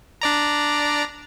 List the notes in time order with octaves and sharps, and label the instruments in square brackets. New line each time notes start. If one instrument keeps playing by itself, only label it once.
[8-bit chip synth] D4 D5 A#5